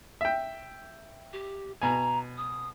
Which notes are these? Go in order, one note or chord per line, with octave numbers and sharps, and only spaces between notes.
E5 G5
G4
B2 G#5 A#5
D#6